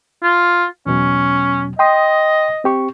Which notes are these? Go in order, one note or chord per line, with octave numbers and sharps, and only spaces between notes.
F4
E2 B2 F#3 C#4
D#5 G5 C6 D#6
C4 G4 C#6